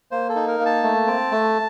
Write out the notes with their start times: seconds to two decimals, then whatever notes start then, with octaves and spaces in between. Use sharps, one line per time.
0.11 A#3 C5
0.29 A4
0.36 D#4
0.48 A#4
0.60 A#3
0.66 A5
0.83 A3
1.07 C4
1.32 A3